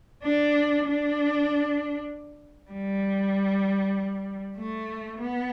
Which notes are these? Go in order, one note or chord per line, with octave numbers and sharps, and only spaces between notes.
D4
D4
G3
A3
B3